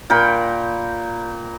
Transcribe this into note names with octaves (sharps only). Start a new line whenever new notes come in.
A#2 A#4 G5 B5